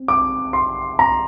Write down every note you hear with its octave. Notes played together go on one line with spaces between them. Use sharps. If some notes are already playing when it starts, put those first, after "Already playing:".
Already playing: C4
D6
C6
A#5